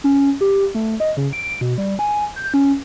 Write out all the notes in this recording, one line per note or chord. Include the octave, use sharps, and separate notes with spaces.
C#4
G4
A3
D#5
C#3
D7
B2
G3
G#5
G6
C#4